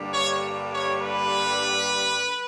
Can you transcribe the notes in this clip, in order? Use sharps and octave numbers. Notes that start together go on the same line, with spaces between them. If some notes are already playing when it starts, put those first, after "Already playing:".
Already playing: G2 D3 G3 A#3
C#5
C#5
B4